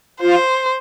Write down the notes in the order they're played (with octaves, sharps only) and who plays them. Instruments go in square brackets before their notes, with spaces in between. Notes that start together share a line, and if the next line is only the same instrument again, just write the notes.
[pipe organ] F4 [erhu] C5